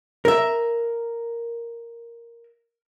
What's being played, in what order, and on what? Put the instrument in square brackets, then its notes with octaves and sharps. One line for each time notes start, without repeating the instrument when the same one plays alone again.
[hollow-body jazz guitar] A#4 E5